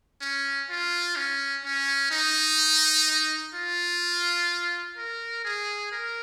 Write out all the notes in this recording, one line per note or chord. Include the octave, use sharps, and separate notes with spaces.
C#4
F4
C#4
C#4
D#4
F4
A#4
G#4
A#4